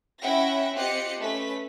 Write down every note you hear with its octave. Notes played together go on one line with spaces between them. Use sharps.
C#4 E4 E5 F#5 G5 A#6
C4 F4 G4 D#5 F#6 C#7
A3 C#4 B4 B6